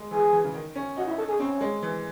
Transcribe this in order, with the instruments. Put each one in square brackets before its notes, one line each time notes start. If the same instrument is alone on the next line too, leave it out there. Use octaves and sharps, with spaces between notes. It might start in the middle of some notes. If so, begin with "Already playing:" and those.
Already playing: [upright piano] G#3
[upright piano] E3 [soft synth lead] G#4
[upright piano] E3
C#3
D#3
C#4
[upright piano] D#4 [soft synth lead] F#4
[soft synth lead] E4
A4
G#4
[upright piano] C4 [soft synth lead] C#4
[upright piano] G#3
E3